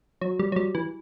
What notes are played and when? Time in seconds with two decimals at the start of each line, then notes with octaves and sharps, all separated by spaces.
0.21 F#3
0.39 G3
0.52 F#3
0.56 G3
0.75 E3